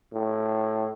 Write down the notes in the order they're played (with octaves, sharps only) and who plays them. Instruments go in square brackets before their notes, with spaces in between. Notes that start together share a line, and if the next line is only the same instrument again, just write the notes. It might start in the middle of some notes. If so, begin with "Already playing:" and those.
[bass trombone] A2